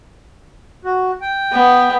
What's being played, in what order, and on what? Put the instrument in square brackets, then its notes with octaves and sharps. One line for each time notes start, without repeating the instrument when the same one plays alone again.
[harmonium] F#4
G5
[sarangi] B3